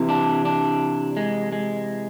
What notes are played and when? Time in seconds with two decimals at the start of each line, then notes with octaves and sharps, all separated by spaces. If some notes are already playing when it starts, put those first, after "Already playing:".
Already playing: C3 E3
0.09 D4
0.45 D4
1.17 G#3
1.53 G#3